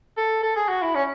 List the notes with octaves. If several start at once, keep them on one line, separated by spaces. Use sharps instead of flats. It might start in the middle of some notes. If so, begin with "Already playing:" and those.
A4
A4
G#4
F#4
E4
C#4